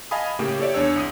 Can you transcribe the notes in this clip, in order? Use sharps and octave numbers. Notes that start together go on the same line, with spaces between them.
D#5 F5 G#5 A5 B5 D#6
A2 C#3 A#3 G4 G#4
G4 A4 C#5 D5 E5
E2 D4 C#5 E6
C2 D#6 D#7